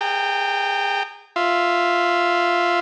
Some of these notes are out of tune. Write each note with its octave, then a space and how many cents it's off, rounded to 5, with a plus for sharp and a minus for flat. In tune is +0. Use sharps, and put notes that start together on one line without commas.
G#4 -30 G5 +0 A#5 -35
F4 +0 E5 +0